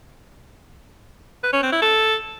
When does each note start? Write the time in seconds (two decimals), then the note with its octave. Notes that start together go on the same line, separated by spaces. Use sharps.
1.44 B4
1.53 C#4
1.63 C4
1.72 E4
1.82 A4